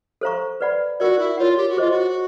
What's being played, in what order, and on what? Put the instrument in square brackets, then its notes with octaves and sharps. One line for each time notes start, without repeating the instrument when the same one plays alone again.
[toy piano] A4 C5 F5 A#5 C#6
B4 D5 F#5 B5
[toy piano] F4 A#4 D5 [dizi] F#4
[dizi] E4
[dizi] F4 [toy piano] A#4 C#5 F#5
[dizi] G4
F#4
[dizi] F4 [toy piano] G#4 C5 D#5
[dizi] F#4